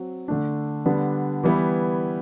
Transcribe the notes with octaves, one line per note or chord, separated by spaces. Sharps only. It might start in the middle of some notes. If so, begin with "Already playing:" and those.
Already playing: F#3 C4 F#4
D3 A3 D4
D3 G3 B3 D4
E3 G3 B3 E4